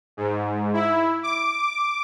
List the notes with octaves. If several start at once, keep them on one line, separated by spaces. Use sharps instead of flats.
G#2
E4
D6